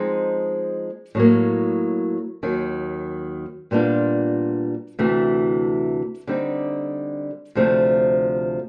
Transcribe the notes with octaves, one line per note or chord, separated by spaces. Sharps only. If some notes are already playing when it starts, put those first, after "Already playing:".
Already playing: F3 G#3 C4 D#4
A2 F#3 A#3
D#2 D#3 F#3
A#2 G3 B3 D4 F4
D2 C3 E3 A3
D3 G3 C4 D#4
D2 C3 F3 A3